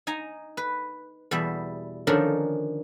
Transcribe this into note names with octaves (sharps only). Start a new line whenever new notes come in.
D#4 G#5 A#5
B4
E2 B2 G3 E5
D3 D#3 F3 C#4 D4 A#4